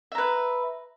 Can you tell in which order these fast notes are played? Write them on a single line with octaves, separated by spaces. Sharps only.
E5 A#5 B4